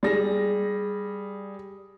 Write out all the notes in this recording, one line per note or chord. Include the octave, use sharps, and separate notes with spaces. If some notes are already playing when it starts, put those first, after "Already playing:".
G3 G#4 A#6